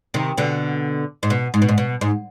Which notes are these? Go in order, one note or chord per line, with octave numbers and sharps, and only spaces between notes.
C3 D#3
B2 D3
G#2
B2
G#2
B2
G#2
B2
G#2